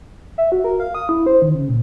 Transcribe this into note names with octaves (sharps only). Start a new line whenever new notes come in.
E5
F#4
A#4
F5
D#6
E4
C5
D#3
C#3
A#2